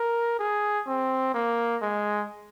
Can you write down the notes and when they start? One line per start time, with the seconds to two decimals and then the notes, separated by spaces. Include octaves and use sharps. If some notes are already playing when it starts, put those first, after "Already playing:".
Already playing: A#4
0.39 G#4
0.87 C4
1.34 A#3
1.82 G#3